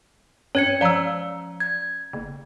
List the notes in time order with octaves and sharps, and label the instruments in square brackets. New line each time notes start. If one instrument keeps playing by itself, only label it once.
[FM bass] G2 [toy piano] C#4 [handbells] C#5 G#6 C#7
[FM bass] F3 [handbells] D5 A#5 [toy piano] F5 E6
[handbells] G#6
[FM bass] F#1